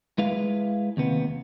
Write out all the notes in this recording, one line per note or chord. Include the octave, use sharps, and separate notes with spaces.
G#3 E4 B4 F5
D#2 C3 B3